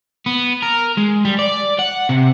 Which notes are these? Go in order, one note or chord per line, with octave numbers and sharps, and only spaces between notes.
B3
A#4
G#3
G3
D5
F#5
C3